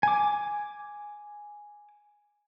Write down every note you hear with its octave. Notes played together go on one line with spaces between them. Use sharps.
G#5 D6